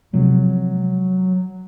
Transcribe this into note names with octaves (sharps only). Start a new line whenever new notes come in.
C3 F3 F#3 G#3